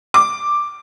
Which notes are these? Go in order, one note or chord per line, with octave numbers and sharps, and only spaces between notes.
D6